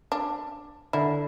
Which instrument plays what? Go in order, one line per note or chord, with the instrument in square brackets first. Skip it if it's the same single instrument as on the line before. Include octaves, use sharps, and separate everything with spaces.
[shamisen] D4
[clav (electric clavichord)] D3 [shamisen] E4